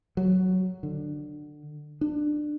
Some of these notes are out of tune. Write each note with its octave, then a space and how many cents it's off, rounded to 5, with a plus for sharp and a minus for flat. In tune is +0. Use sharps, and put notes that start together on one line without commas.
F#3 +5
D3 +20
D4 +20